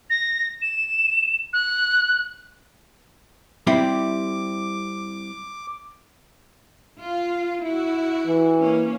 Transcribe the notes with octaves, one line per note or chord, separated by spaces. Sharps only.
A#6
E7
F#6
G3 C4 E4 D6
F4
E4 F#4
E3
A#3 C#4